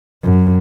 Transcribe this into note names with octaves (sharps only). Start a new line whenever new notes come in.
F#2